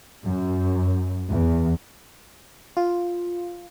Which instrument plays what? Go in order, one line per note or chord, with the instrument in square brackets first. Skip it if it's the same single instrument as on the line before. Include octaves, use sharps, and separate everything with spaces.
[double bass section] F#2
E2
[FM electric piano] F4